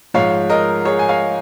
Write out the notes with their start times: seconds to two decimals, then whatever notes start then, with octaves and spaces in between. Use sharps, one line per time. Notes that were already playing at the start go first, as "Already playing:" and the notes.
0.14 G#2 F3 C#5 F5
0.50 A#4 D#5
0.85 G#4 C#5
0.99 G#5
1.09 C#5 F5